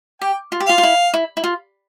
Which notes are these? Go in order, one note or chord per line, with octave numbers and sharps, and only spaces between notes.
G4 G5
F4
G4
F4 F5
F4
E4
E4
E4
F4